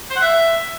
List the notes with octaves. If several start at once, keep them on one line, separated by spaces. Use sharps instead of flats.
C5
F#5
E5